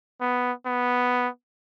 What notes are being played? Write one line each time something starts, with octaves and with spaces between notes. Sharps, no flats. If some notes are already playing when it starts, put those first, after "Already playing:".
B3
B3